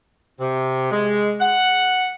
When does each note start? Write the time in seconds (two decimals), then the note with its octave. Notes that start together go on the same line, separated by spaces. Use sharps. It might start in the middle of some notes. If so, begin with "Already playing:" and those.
0.40 C3
0.91 G#3
1.40 F#5